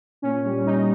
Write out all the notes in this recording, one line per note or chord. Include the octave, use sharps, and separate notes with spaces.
A#2 C#4
G3
G3 D#4